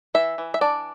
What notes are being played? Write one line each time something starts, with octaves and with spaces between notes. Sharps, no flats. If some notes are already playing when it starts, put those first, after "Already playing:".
E3 E5
E3
E5
D4 D5